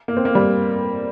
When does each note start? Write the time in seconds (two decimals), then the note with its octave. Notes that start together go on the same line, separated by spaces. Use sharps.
0.08 A#3
0.17 C4
0.25 A#3
0.35 G3